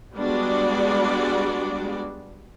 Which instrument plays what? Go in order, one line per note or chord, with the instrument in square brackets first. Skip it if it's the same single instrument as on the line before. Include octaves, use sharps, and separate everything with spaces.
[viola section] G3 G#3 B3 D4 F#4 D5